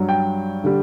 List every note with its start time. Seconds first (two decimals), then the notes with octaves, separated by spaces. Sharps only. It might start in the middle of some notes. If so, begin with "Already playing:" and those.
Already playing: G2 F#3
0.09 G5
0.64 D3 G3